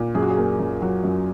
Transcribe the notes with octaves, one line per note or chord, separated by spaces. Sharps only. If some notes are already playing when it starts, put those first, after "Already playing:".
Already playing: A#2
F#2 G#4
F#4
G#4
A#3
F#2
F#3 F#4
F#2